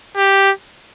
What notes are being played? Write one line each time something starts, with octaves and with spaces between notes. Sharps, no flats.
G4